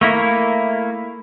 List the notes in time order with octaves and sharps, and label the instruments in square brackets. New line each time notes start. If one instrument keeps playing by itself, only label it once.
[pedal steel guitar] A3 A#3 E4